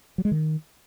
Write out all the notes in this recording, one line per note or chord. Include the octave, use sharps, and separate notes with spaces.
F#3
G#3
D#3